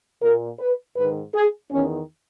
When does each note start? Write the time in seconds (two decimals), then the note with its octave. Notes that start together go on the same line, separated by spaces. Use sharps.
0.22 A#2 A#4
0.60 B4
0.97 G#2 D#3 B4
1.34 G#4
1.72 E2 D#3 C#4